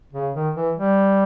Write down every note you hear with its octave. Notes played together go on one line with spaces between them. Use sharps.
C#3
D#3
E3
G3